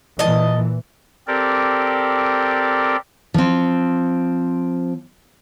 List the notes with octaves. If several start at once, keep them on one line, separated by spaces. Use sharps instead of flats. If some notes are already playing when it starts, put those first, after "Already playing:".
A#2 E3 D#5 A5
C4 G4 A4 A#4 D5
F3 C4